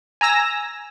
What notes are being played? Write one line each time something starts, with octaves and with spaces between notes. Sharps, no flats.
G#5 A#5 E6 A#6